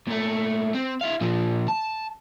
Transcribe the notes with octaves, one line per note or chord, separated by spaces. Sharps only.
A#2 A3
C4
E4 F5
A#2 F3
A5